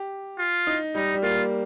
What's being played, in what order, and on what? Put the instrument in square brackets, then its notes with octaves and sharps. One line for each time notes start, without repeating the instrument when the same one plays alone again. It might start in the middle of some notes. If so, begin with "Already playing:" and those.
Already playing: [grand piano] G4
[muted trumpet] F4
[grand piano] D#4
[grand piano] G3 [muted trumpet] D#4
[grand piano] G3
[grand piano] A#3 [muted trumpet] F4